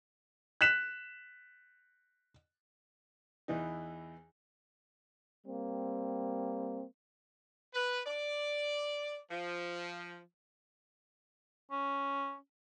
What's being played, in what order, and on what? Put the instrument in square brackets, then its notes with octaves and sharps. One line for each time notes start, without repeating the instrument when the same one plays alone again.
[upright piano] F#6 B6 E7
[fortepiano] E2 E3 D#4
[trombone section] G3 A#3 C4
[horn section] B4
D5
F3
[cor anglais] C#4